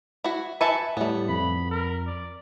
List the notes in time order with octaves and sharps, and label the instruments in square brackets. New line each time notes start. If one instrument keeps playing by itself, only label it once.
[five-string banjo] E4 F#4
[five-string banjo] B4 E5 A5 [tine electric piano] G#5 C#7
[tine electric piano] A2 G3 [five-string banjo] A3 B3
[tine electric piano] F2 [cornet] B5
[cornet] A#4
D5